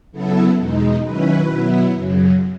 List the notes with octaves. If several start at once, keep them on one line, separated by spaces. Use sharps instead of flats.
C#3 F#3 B3 E4 A4
E2 B2 G#3 D#4
D#3 F#3 C#4 E4 B4
B2 F#3 B3 E4
F#2 C#3 F#3